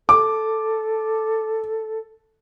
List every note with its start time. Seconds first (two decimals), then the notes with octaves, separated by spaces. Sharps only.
0.09 A4 D6